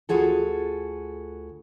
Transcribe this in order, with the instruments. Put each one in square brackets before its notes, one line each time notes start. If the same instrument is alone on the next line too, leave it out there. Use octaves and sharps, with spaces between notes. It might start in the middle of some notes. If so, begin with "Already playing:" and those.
[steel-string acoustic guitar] D2 F4 F#4 G#4 A4